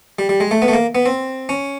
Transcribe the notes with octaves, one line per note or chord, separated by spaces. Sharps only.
G3
G3
G#3
A3
B3
A3
A#3
B3
C4
C#4